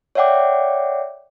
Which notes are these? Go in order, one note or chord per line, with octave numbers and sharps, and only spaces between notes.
C#5 D5 E5 F#5 G5 D6